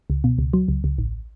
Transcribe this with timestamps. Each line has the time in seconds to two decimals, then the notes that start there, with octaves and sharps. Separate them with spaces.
0.10 C#2
0.24 B2
0.38 C#2
0.53 F#3
0.68 C#2
0.84 C#2
0.98 A1